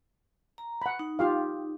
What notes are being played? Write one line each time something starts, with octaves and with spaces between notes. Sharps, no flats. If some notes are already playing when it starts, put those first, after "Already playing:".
A#5
F#5 B5
D#4
F4 G4 F5